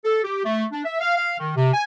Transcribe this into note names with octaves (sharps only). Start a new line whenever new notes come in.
A4
G4
A3
D4
E5
F5
F5
D#3
C3
G#5